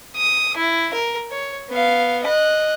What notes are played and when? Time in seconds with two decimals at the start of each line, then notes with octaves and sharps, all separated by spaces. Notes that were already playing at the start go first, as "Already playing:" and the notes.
0.16 D#6
0.57 E4
0.93 A#4
1.31 C#5
1.70 B3 F5
2.23 D#5 F#6